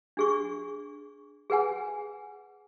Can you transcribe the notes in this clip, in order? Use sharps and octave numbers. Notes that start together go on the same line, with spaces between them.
D4 G#4 C#6
G#4 B4 F#5 G#5